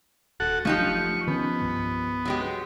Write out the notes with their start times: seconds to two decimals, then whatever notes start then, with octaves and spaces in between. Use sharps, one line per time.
0.40 D#1 F#4 A4 F#5
0.65 F#1 F3 F#3 A3 D#4 G4 C#6
1.27 D#3 B3 C#4
1.62 C2 G2
2.25 F#3 G#3 G4